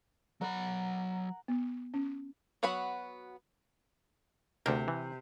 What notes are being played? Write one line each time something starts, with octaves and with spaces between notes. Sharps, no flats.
F#3 A#4 F#5 B5
B3
C#4
F#3 B3 F#4 F#5 B5
D2 C3 D4 A#4
E3